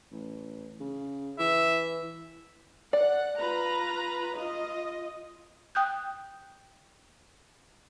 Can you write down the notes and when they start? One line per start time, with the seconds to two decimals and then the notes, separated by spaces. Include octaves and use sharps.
0.12 A1
0.80 C#3
1.39 E3 E5
2.93 D5 F#5
3.38 F4 B4 A#5
4.37 F4 D#5
5.75 G5 D#6 F#6 G6